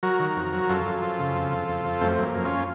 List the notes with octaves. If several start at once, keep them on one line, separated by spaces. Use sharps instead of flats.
F#3 F#4 A#4
D#3
F2
F#3
F#2 F4 A4
F#2
F3
C#3
F2
F2
F2
F2
F#2 A3 C4
F#2 A#3
F#2
C#4 F4